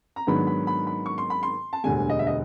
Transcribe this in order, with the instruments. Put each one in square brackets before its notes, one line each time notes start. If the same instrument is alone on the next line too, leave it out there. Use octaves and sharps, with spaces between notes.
[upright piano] A#5
G#2 D#3 F#3 B3 D4 B5
B5
B5
B5
C#6
C6
B5
C6
A5
E1 D2 D3 G3 G#5
D#5
E5
D#5